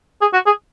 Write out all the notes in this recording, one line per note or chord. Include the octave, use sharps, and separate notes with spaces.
G#4
F#4
G#4